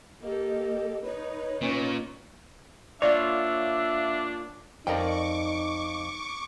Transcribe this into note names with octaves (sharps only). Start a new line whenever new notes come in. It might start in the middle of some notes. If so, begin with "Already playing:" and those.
A#3 G4 A4 D#5
D#4 B4 C#5
A#2 C#4
A#3 D4 F4 C#5 D5 E5
F2 D#4 A#4 D5 G5 C#6 D6